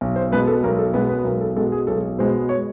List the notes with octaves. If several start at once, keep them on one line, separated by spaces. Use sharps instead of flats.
B1
C5
B2 G#3 B3 B4
A4
B1 A#4
A4
B2 G#3 B3 B4
B4
B1 A#4
A4
B2 G#3 B3 A4
G#4
B1 A4
B2 G#3 B3 C5
C#5